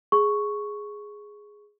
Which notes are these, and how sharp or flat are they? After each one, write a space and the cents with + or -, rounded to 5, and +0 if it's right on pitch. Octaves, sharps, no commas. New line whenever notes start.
G#4 +0 C#6 +0